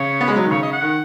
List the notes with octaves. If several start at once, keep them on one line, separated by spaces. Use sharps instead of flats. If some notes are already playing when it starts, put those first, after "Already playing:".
Already playing: C#3 C#5
B3
G#3
F#3
D#3
C#3 C#5
D#5
F#5
D#3